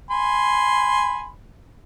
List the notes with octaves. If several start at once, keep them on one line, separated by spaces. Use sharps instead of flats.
G#5 B5 C6